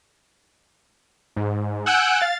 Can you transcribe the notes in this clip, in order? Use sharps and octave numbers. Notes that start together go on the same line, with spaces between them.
G#2
F#5 G#5 E6 F#6 G6 D7
F5 A6